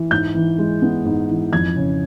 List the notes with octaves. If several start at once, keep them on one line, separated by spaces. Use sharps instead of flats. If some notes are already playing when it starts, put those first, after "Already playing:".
Already playing: E3
G#2 G6
E3
G#3
B3
G#2
E3
F2 G#6
C#3